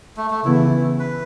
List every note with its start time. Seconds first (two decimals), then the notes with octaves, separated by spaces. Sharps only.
0.17 A3
0.31 A3
0.45 C#3 E3 B3 E4
0.99 B4